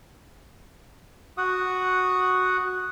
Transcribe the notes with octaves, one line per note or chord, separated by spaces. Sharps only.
F#4 F#5 D#6